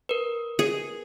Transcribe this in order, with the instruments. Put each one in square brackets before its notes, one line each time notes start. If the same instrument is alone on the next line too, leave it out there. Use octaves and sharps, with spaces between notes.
[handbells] A#4 B4
[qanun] G#4